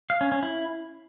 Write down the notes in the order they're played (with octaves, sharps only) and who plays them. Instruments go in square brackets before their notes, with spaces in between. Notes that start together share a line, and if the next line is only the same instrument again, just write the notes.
[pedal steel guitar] F5
C#4
C#4
E4